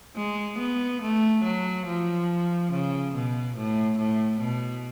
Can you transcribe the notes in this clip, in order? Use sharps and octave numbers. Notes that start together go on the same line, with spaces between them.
G#3
B3
A3
F#3
F3
C#3
B2
A2
A2
B2